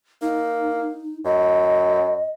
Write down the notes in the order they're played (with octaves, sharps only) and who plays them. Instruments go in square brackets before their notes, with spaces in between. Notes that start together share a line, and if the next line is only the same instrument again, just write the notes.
[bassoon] A#3 [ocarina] D#4
[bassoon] F#2 [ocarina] D#5